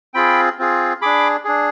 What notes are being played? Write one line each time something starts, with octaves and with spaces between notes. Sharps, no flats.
C4 F4 G#4 G5 B5
C4 F4 G#4
D4 G#4 B5 D6
D4 G#4